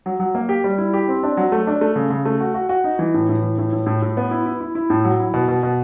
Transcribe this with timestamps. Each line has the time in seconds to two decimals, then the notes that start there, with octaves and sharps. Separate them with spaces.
0.06 F#3
0.20 F#3
0.35 A#3
0.49 G4
0.64 G3
0.78 E4
0.93 G4
1.08 C4
1.23 D4
1.37 F#3
1.52 A3
1.67 D4
1.81 A3
1.96 C#3
2.10 C#3
2.25 A3
2.40 F#4
2.54 F#4
2.69 F#4
2.84 D#4
2.99 E3
3.14 A2
3.29 A2
3.42 E3
3.58 A2
3.73 A2
3.86 A2
4.02 A2
4.17 B3
4.31 E4
4.46 E4
4.61 E4
4.75 E4
4.90 A2
5.05 F#3
5.20 E4
5.34 B2
5.48 B2
5.63 B2